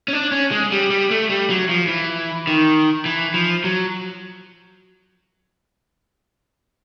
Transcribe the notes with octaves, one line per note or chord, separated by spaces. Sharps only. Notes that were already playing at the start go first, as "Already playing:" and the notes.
C#4
D4
C#4
G#3
G3
G3
A3
G3
F#3
F3
E3
D#3
E3
F3
F#3